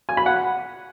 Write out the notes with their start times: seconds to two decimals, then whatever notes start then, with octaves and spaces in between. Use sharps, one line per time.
0.09 G#5
0.17 B5
0.26 F#5